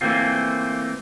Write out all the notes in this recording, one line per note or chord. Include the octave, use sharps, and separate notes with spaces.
E3 A3 A#3 C4 F4